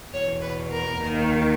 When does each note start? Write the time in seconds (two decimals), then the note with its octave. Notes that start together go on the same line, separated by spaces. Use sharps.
0.12 E2 B2 C#5
0.41 B4
0.70 A#4
1.00 D#2 D#3